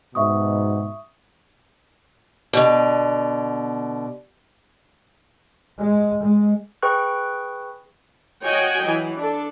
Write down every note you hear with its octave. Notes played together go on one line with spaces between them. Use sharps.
G#2 B2 E5 C#6 D#6
B2 D3
G#3
G#3
G#4 B4 G5 C#6 F#6
F#4 C#5 D#5 G5 G#5
E3 F#3
D4 A4